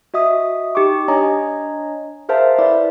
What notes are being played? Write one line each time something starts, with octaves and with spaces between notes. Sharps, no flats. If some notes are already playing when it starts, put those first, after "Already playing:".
F#4 D#5 E5 D#6
D#4 G4 G5 C#6 D6
D4 C#5 D#5 G#5 A#5
G#4 A#4 C5 E5 F5 A5
E4 B4 D5 E5